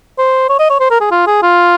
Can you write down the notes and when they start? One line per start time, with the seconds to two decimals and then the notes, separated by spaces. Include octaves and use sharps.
0.18 C5
0.49 C#5
0.59 D#5
0.70 C#5
0.80 C5
0.91 A#4
1.01 G#4
1.11 F4
1.27 G#4
1.43 F4